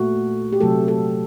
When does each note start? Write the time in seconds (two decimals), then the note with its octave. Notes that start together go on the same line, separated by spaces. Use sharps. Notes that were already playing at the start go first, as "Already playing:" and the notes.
Already playing: A#2 A3 F#4
0.53 G4
0.60 C3 F#3 A3 A4
0.88 A4